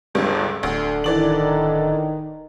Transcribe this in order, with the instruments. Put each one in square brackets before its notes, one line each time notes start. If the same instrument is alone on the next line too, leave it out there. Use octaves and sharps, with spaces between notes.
[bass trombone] G1 [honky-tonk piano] C#2 G2
[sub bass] D1 [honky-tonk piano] D2 [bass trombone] D3
[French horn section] D#3 [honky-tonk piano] E3 D5 F#7